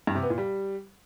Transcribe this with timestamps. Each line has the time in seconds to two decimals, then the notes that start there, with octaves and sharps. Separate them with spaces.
0.07 G2
0.15 C3
0.23 B3
0.30 A#2
0.38 G3